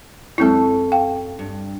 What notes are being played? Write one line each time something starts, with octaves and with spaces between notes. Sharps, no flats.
F#2 G#3 C4 E4 A4
F5 G5
G2